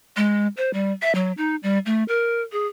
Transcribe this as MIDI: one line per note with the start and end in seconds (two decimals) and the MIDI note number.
0.16 0.47 56
0.57 0.72 72
0.73 0.92 55
1.02 1.14 76
1.15 1.32 54
1.37 1.56 63
1.63 1.78 55
1.86 2.03 57
2.08 2.42 70
2.52 2.66 68